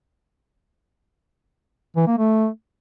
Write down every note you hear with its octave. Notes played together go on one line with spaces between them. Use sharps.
E3
A#3
A3